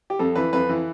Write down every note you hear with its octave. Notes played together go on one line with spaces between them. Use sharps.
G4
F2 A4
E3 B4
F2 B4
E3